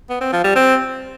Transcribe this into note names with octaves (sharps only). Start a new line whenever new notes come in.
B3
C4
F3
G3
C4